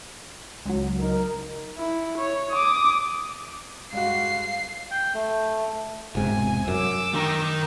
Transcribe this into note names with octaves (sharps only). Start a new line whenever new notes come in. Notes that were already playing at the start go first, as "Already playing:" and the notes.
C#2 F#3
D#4 A#4
E4
C#5
D6 D#6
G2 G#3 F#4 F5 C7
G5
A3
E1 G#2 C3 G#5
F#2 D6 E6
D#3 A#4